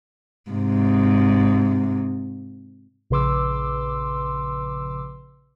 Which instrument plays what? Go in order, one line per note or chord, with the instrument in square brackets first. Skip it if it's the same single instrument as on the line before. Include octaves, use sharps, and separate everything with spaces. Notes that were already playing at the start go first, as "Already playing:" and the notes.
[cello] G#2 C3
[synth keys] A#1 C#3 B4 C6 D6 E6